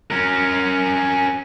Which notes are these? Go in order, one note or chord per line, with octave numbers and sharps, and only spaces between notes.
C#4 A#4